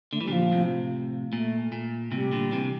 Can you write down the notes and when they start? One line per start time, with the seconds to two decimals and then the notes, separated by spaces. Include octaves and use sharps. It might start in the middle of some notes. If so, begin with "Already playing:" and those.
0.12 D3 A3
0.21 E3 G3
0.28 A#2 D3 F3
0.51 A2 C3
1.32 A#2 A3
1.72 A#2
2.12 A2 C3 G3
2.32 A#2 D3
2.52 C3 E3